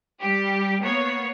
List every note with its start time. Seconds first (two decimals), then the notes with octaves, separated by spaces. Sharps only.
0.21 G3 G4
0.82 A#3 B3 C#5